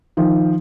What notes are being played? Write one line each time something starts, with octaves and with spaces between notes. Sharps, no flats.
D#3 F3